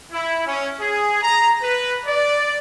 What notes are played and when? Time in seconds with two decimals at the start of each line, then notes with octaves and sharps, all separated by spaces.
0.12 E4
0.47 C#4
0.80 G#4
1.23 A#5
1.62 B4
2.06 D5